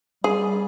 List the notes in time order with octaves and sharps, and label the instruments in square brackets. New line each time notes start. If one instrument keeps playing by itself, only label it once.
[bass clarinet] G3 [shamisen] G#4